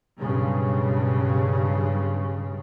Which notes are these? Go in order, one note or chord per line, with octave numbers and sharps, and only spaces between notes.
B1 G2 C#3